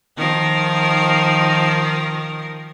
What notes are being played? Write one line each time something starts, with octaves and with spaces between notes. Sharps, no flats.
D#3 F3 A#4